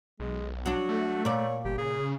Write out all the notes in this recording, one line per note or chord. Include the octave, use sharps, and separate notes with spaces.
B1 G#3
F#3 D4 F#4
A3
A#2 C#5 D5
G1 G4
C#3 G#4